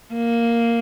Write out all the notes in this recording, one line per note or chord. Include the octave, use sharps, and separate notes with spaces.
A#3